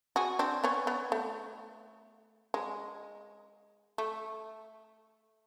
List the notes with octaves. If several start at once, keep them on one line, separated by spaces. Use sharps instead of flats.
F#4 G#4
C4 D4
B3 C#4
B3
A3
G#3
A3